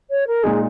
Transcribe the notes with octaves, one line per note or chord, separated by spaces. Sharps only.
C#5
A#4
A#2 G#3 D#4 G#4